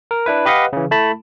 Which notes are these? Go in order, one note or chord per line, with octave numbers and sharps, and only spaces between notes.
A#4
D4 E4 B4
G4 B4 D#5 F5 F#5
C#3 E3
A3 E4 A5 B5